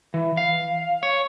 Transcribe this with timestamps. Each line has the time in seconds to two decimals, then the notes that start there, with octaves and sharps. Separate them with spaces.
0.14 E3
0.37 F5
1.03 C#5